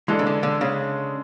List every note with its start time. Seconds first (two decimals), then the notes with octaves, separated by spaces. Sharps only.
0.08 E3 G#3 D4 A4
0.19 C#3
0.26 D3
0.43 D3
0.61 C#3